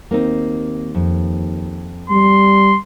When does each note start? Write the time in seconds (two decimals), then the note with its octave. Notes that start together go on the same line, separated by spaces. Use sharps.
0.11 D#2 A#3 C4 D#4
0.94 F2
2.10 G3 C6